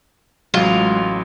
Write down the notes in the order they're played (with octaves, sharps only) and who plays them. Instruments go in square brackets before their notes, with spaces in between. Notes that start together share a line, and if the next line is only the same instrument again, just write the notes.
[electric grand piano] A1 F#3 [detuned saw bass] G#3 [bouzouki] F4